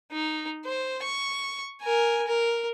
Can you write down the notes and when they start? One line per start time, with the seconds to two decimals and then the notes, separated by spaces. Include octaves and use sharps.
0.12 D#4
0.65 C5
1.03 C#6
1.81 A#4 G#5
2.27 A#4